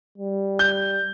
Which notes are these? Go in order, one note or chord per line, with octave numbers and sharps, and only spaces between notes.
G3
G6